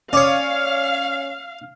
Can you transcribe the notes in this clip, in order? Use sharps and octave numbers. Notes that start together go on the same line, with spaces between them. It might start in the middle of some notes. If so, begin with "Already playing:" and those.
C#4 C#5 D5 F5 C#6 D#6